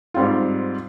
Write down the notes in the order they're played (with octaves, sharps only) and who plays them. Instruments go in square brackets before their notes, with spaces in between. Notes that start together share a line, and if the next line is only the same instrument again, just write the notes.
[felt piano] G#2 G3 C4 F4